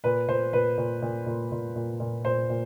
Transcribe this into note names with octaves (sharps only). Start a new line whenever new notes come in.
A#2 B4
A#2 C5
A#2 B4
A#2
A#2
A#2
A#2
A#2
A#2
A#2 C5
A#2